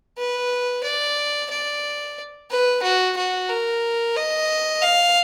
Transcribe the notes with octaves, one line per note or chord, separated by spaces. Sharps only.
B4
D5
D5
B4
F#4
F#4
A#4
D#5
F5